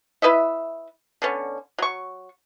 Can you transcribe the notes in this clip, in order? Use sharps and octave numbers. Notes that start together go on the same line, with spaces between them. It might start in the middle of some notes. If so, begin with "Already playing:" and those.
E4 B4 D#5 E5
D3 B3 C#4
F#3 C#6